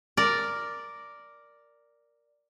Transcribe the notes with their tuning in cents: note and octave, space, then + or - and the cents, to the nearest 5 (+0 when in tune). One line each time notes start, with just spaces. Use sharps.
A#4 +0 D5 +0